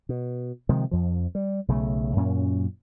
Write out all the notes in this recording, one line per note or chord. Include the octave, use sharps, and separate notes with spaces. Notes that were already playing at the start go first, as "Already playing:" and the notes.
B2
C3 D#3 F3 G#3
F2 F3
G3
B1 C#3 E3 A3
F#2 A#2 B3 C#4